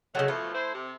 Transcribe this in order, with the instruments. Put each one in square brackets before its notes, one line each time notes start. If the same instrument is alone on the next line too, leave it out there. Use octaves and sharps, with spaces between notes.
[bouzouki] C#3 F#3 [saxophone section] G#3 A3
[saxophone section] B2 E3 F3 [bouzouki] A3
[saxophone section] E4 C5
C3